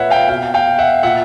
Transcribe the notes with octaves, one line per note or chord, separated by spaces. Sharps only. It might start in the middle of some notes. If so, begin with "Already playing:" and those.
Already playing: A#2 B4 C#5 E5 F#5
F5 G5
B2 F5 G5
F5 G5
E5 F#5
A#2 E5 F#5